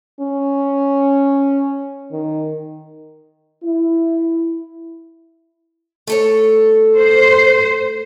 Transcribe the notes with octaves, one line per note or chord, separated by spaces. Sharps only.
C#4
D#3
E4
A3 A4 C#5
C5